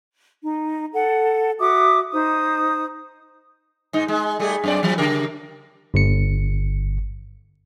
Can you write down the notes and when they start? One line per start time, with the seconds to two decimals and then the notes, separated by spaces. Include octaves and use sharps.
0.43 D#4
0.93 A4 F#5
1.59 F#4 E5 D6 D#6
2.12 D#4 C5 D#6
3.93 G#2 D#4
4.08 G#3
4.39 G3 A3 G#4
4.64 F#2 C4 D5
4.83 F3 F#3
4.98 C#3 G4 A#4
5.94 G1 C#7